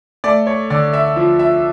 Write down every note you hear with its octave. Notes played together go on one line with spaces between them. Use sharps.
A3 D5
C#5
D3 D5
E5
F3
E5